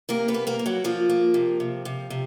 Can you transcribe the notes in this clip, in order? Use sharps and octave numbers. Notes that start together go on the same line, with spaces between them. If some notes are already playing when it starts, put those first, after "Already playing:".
C3 A#3 A#4
B3 B4
A#3
A#3 A#4
A#3
F#3 F#4
F3 A#3 F4
A#3
C3
C3
C3
C3